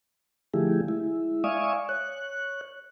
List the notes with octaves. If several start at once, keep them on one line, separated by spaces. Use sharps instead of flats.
D3 F3 A3 E4 G4 G#4
G#3 E4
D5 E5 F5 G#5 C#6 D#6
C#5 F#6